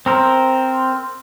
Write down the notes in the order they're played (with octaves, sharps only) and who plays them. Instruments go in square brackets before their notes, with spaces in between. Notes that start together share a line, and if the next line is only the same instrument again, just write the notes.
[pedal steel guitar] C4 A#4 C5